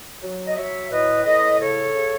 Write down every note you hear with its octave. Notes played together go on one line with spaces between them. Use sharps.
F#3
D#5
F#3 C#5 E5
A2 B4 D#5
A2 B4 D#5
C#3 A4 C#5
C#3